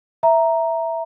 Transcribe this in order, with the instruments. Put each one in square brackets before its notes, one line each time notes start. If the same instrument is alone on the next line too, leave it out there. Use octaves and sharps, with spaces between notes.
[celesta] E5 A#5